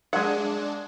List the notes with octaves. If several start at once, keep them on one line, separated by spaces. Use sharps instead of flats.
G#3 D4 F#5